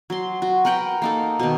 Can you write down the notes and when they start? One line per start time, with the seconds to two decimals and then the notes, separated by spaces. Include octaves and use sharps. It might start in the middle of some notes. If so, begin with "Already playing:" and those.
0.10 F#3 C6
0.42 F#4
0.65 A#4 B4 F#5 G5
1.02 A#3 D#4 A4
1.39 B2 D#3